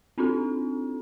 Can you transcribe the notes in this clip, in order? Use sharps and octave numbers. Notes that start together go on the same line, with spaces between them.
C4 D4 D#4 F4 A4